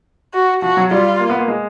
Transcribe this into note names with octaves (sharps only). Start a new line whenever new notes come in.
F#4
F3 F#4
F#3
G3 F4
A#3
B3
A#3
G#3